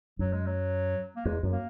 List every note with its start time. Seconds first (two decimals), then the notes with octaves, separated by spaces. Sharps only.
0.19 F#2 F#3
0.33 G#3
0.46 F#3
1.16 A#3
1.25 E2 G#3
1.43 F#2
1.52 A#3